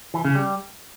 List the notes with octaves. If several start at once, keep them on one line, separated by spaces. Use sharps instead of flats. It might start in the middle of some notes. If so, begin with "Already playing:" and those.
E3
C#3
G3